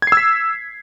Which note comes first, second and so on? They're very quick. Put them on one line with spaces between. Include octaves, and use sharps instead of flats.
G#6 C7 E6 B6